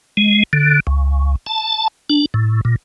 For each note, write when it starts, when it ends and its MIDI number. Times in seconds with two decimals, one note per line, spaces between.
0.17 0.43 56
0.53 0.80 50
0.87 1.35 37
1.46 1.88 81
2.10 2.26 62
2.34 2.61 45
2.65 2.76 46